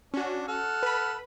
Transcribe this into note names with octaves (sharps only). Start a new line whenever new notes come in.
C#4 D4 F#4
A4 F#5 F6
B4 B5